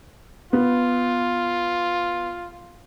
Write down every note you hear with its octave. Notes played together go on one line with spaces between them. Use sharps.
B3 F4